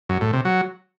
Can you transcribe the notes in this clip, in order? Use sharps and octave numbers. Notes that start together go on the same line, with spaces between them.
F#2
A2
C3
F#3